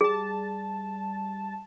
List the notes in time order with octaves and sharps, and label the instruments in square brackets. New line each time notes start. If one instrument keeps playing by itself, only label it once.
[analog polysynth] G3 A5 [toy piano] G#4